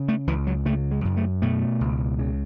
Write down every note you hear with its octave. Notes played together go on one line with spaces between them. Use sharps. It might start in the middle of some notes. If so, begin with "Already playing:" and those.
Already playing: C#3
A3
C#2 E3
F#3
C#3 A3
G#3
F#2
A3
B2 A3
C#2
C#3